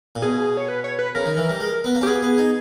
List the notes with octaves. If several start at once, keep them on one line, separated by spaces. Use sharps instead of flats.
A#2
B2 G#4
C#5
B4
C#5
B4
C#3 A#4
D#3
E3
G3
G#3
B3
A#3
C#4 G4
B3 G#4
B3
D#4